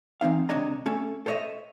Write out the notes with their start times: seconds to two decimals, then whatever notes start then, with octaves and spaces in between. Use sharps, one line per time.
0.21 E3 C4 D#4 F5
0.49 C#2 C3 D4 C#5 D#5 A#5
0.86 A3 C#4 A4
1.26 A4 C5 C#5 D#5 E5